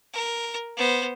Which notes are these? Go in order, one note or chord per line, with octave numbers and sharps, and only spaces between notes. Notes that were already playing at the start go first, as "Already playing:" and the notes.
A#4
B3 C5